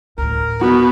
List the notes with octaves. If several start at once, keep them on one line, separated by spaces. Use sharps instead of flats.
D2 A2 A#4
B3 F#4